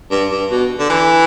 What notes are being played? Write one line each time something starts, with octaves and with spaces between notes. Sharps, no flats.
G2
G2
B2
D3
E3